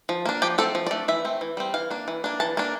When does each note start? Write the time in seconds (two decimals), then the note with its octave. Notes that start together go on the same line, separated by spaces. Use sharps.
0.09 F3
0.26 A#3 D4
0.42 F3 G4
0.58 A3 C4 A4
0.75 F3
0.87 D5
0.91 A3 D4
1.08 E3 E5
1.25 A3 C4
1.41 E3
1.57 G3 C4
1.74 E3 F5
1.91 A#3 D4
2.08 E3
2.24 A#3 D4
2.40 E3 A5
2.57 A#3 D4